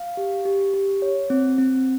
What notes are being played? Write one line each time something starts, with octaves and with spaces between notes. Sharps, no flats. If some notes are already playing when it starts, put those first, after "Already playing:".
Already playing: F5
G4
G4
G4
C#5
C4
C4